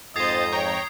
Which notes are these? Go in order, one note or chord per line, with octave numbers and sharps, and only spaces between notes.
F2 G#2 C5 D#5 D#6 G#6 A6 C7
C#5 G5 A#5